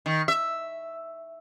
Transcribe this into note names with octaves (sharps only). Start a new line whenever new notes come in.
D#3
E5